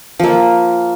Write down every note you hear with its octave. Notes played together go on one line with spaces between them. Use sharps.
F3 A#3